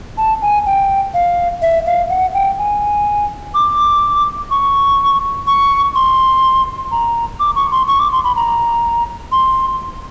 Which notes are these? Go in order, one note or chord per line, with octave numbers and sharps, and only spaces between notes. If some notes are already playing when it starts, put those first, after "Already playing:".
A5
G#5
G5
F5
E5
F5
F#5
G5
G#5
D6
C#6
C#6
C6
A#5
D6
C#6
C6
C#6
D6
C6
B5
A#5
C6